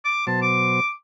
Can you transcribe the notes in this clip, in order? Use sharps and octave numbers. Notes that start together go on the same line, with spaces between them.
D6
B2 F#3 C5 A5
D6